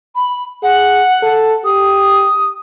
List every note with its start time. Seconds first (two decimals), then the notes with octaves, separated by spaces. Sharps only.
0.15 B5
0.63 G#4 F#5
1.23 A4
1.64 G4 D#6